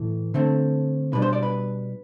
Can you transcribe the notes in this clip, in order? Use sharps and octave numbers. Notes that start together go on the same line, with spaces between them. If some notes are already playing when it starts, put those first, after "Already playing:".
Already playing: A2 E3 A3
D3 A3 C4
B2 G3 D4 B4
C5
D5
B4